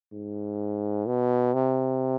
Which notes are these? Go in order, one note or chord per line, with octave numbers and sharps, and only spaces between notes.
G#2
B2
C3